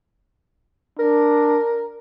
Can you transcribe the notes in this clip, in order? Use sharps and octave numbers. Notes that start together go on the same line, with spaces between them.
D4 A#4